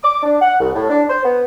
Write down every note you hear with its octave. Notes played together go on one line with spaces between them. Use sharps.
D6
D4
F#5
C2
A2
D4
C5
B3